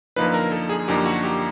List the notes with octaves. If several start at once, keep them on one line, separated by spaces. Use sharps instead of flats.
F#2 D3 F3 A#3 D#4 B4
A#4
A4
G#4
F#2 D3 F3 A#3 D#4 G4
F#4
G4